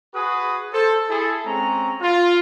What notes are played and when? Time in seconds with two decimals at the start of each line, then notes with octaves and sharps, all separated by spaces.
0.14 F#4 G#4 B4 D#6
0.72 A4 C5
1.08 E4 G#4 A4
1.45 G#3 C4 C#4 A#5
2.01 F4